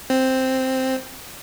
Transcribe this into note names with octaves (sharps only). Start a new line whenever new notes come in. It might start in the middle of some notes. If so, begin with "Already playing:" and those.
C4